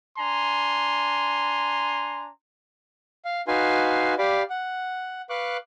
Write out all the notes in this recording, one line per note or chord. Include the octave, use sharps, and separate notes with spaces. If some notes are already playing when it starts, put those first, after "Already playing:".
D4 G#5 A#5 C6
F5
D#4 F#4 B4 F5 G#5 C6
G4 D5 F5 B5 D6
F#5
B4 F5 C#6 D6 F#6